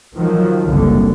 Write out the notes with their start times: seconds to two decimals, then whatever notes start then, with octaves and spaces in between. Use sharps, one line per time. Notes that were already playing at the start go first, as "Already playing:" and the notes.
0.16 D#3 F3 F#3
0.68 F#1 C2 D3